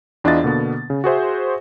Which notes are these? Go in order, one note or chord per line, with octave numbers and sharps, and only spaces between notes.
E2 D4 E4 F4 D#5 A6
B2 D3 A#3 B3
C#3
F#4 G#4 C5 E5